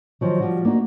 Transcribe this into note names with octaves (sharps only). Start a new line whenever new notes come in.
D#3 F3 F#3
F3 G3 F#4
A#3 D4 D#4 F#4